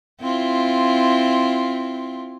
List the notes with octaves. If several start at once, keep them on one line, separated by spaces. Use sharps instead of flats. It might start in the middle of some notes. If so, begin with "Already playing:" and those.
C4 E4 F4